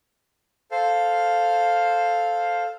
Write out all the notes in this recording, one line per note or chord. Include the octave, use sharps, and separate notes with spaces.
A4 C5 F5 F6